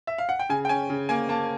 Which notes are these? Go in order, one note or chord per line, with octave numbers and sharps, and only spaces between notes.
E5
F5
F#5
G5
C#3 G#5
G5
C#4 G#5
C#3
A#3 G#5
A#3 A5